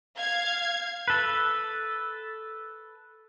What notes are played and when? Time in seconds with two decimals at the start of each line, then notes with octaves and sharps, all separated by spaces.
0.18 F5 G#6
1.08 A4 B4